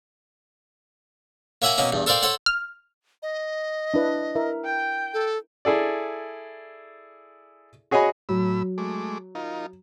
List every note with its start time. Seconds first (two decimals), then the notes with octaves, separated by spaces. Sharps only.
1.62 A#3 C#5 E5 F#5 G#5 A#5
1.78 B2 F#3 A#3 C#4
1.92 E2 G2
2.06 A4 A#4 C5 D5 F5 G5
2.23 A4 C5 C#5 F#5
2.46 F6
3.22 D#5
3.94 D4 E4 B4
4.35 E4 A#4 E5
4.65 G5
5.14 A4
5.65 E4 G#4 A4 D5
7.91 F#4 G#4 C#5 D#5 G#5 B5
8.29 A2 F#3 B5 E6
8.78 G#3 A3 D6
9.35 D#4 F4 A#4